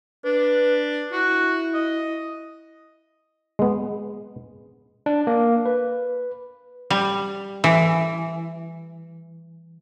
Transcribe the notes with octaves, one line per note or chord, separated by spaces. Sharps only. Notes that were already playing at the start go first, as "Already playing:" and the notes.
D4 B4
E4 F#4
D#5
G#3 B3
D4
A#3
B4
G3
E3